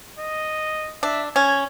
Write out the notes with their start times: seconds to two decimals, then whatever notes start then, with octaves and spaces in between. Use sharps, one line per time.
0.19 D#5
1.03 D4 E5
1.36 C#4 G#6